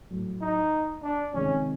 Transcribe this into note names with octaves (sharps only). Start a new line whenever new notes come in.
A2 F#3 A3
D#4
D4
C3 D#3 G#3 C#4